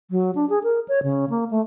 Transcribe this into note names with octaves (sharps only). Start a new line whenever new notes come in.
F#3
D4
G#4
A#4
C#5
C#3
A#3
A3